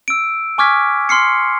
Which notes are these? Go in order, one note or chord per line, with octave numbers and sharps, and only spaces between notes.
E6 D7
G#5 C#6 D6 F6 G#6 B6
C6 F6 C7 C#7